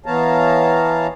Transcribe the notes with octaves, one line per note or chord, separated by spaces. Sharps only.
E3 B3 C#5 F5 A5 A#5